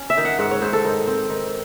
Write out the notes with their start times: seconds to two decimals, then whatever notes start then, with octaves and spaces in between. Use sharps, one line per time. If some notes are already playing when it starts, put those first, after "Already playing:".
Already playing: C#4
0.10 E5
0.17 D#3
0.25 F#5
0.39 G#2 F#5
0.51 C#5
0.61 G#2 C5
0.73 A4
0.85 D#3
1.07 C4
1.30 D#3